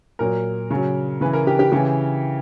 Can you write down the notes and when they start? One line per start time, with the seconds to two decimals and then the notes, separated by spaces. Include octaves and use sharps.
0.19 A#2 F#3 A#4
0.71 C#3
0.76 F#3
1.21 C#3 E3 B4
1.33 A#4
1.47 G4
1.59 G4
1.72 C#3 E3 G4